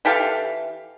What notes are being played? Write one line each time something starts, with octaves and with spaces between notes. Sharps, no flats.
E3 G4 A4 F5